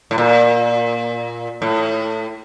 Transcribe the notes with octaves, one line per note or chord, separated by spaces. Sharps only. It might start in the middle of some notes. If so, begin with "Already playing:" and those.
A2
A#2
A2